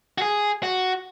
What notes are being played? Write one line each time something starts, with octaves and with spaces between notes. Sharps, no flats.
F#4
G#4
F#4